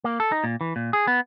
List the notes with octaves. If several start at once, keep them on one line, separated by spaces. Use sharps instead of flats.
A#3
A4
D#4
A#2
E3
A#2
G#4
B3